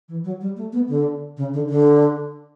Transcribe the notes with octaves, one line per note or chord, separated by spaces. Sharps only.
E3
F#3
G3
A3
B3
D3
C#3
D3
D3